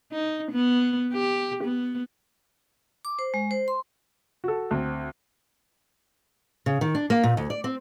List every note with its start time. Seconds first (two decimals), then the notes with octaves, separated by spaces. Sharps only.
0.12 D#4
0.52 B3
1.13 G4
1.64 B3
3.05 D6
3.19 C5
3.34 G#3
3.51 C5
3.68 C6
4.44 F#4 A4
4.71 D2 C4
6.66 C#3
6.81 D#3
6.95 D4
7.10 A#3
7.24 A#2
7.37 D2
7.50 D5
7.64 C4